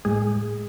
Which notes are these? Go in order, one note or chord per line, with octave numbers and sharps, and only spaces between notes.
A2 G#3 G#4